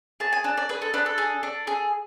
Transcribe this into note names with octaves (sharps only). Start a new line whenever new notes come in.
G#4 A5
G#5
D4 A5
D5
G#4 B4
A4
D4 B4
A4
G#4
D4
G#4